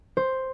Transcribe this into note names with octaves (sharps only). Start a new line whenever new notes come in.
C5